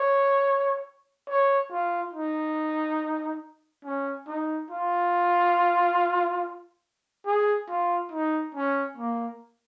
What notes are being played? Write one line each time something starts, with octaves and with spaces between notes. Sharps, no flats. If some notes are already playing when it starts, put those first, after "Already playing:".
Already playing: C#5
C#5
F4
D#4
C#4
D#4
F4
G#4
F4
D#4
C#4
A#3